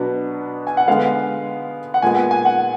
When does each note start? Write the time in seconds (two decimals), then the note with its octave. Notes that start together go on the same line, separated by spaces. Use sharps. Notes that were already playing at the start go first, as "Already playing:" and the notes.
Already playing: B2 F#3 B3 D4
0.67 G#5
0.77 F#5
0.88 D3 G#3 B3 F5
1.94 F#5
2.02 A#2 G#3 B3 G#5
2.16 F#5
2.31 G#5
2.45 F#5